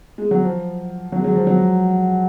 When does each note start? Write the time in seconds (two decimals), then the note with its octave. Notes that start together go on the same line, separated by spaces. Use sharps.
0.18 G#3
0.31 F#3
0.44 F3
1.12 F#3
1.19 G#3
1.24 F#3
1.35 F3
1.47 F#3